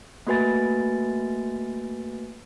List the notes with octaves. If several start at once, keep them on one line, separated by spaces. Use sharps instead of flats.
A3 A#3 F#4 B4 G#5 A6